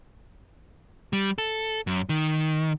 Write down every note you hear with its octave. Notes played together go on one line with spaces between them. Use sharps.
G3
A4
F#2
D#3